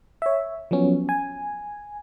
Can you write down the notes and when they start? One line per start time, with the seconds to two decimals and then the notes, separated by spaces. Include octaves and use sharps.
0.22 C#5 E5
0.71 F3 F#3 B3 C#4
1.09 G#5